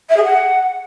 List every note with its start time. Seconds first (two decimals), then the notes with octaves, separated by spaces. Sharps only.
0.09 E5
0.17 G#4
0.24 F#5